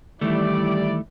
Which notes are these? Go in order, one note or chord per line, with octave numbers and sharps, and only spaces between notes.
D#3 E3 G3 A3 E4 D5